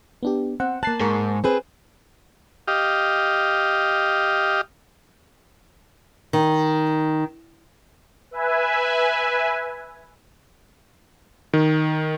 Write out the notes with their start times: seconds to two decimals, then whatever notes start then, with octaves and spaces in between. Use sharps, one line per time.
0.23 B3 D4 G4
0.60 C4 F#5
0.83 A#3 A5 F#6 A6 C7
1.00 G#2 G#4 A#4 C#6
1.44 C4 G#4 B4
2.68 G4 D#5 F5
6.33 D#3
8.31 B4 E5 G#5
11.53 D#3